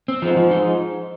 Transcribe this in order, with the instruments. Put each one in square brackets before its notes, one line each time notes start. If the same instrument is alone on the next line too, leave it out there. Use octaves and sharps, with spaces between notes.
[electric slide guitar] C4
[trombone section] G#2 [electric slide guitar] F3
[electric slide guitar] F3
D#4